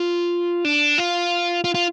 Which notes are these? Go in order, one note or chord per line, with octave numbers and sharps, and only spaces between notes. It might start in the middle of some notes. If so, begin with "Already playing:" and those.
Already playing: F4
D4
F4
F4
F4